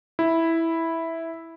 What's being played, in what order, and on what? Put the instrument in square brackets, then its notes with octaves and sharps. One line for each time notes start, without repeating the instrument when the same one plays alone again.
[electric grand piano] E4